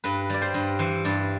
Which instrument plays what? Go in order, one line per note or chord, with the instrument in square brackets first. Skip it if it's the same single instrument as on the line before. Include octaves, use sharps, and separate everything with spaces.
[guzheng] G2 B4
G3 D5
C5
G2
E3 C5
G2 D5